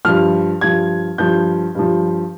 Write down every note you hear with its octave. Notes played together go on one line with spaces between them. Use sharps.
G2 F3 F6
G2 F3 G#6
G2 F3 G6
G2 F3